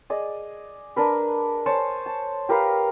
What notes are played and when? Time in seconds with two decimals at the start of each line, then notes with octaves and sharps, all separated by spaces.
0.10 G#4 D5 D#5
0.96 D4 A#4 B4
1.66 C5 C#5 G#5 A5
2.06 A5
2.49 G4 A#4 B4 F5